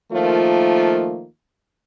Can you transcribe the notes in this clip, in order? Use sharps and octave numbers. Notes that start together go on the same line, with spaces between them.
D#3 F3 A3 A#3 F4